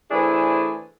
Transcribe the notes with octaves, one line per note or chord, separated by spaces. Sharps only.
E3 A3 D4 E4 G#4 C5